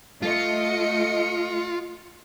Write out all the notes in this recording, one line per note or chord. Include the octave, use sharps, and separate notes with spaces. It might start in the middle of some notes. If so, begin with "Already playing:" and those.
A3 F4 D#5 C#7